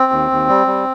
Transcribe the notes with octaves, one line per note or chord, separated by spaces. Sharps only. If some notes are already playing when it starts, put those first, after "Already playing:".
Already playing: C4
D#2
D#2
G3
G3